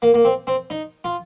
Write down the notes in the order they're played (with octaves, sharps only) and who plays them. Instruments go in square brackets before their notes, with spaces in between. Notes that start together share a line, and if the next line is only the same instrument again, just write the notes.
[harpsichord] A#3
A#3
C4
C4
D#4
F4